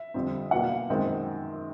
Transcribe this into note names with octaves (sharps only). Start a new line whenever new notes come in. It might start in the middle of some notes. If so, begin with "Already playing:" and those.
Already playing: E5
F2 D3 G3 C4
E2 B2 F#3 A#3 D4 F#5
F5
F#2 D#3 G#3 C4